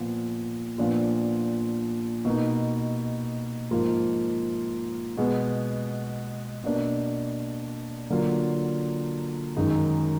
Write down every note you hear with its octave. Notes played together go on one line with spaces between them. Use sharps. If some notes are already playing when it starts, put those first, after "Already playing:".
Already playing: A#2 F3 B3
A#2 F3 B3 D4 F4
B2 A#3 D#4
G#2 F3 A#3 F4
B2 G#3 B3
B2 A#3 D4
D3 F#3 A#3 D4 F4
F#2 D#3 G#3 D#4